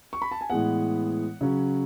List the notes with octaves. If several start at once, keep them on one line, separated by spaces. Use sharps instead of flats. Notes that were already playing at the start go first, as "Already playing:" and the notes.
C#6
B5
A5
G#5
A2 E3 G#3 B3 F#5
C#3 F#3 C#4